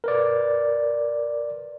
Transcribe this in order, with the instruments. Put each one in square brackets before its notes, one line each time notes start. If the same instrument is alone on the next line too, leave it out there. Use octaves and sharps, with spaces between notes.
[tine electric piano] A#4 B4 D5